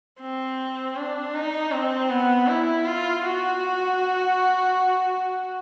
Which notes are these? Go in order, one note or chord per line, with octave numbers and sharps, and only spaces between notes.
C4
D4
D#4
C4
B3
E4
F4
F#4